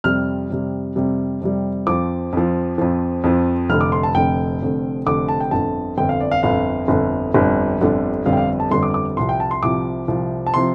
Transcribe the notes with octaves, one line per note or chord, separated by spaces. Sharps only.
F2 C3 G3 F6
F2 C3 G3
F2 C3 G3
F2 C3 G3
F2 F3 D6
F2 F3
F2 F3
F2 F3
F1 F2 D3 F6
D6
C6
A5
F1 F2 D3 G5
F1 F2 D3
F1 F2 D3 D6
A5
G5
G1 F2 D3 A5
G1 F2 D3 G5
F5
D5
F5
G1 F2 D3 F5
G1 F2 D3
G1 F2 D3 G3
G1 F2 D3 G3
G1 F2 D3 G3 F5
G5
F5
A5
G1 F2 D3 G3 C6
D6
D6
C2 C3 F3 C6
G5
A5
C6
C2 C3 F3 D6
C2 C3 F3
A5
C3 F3 C6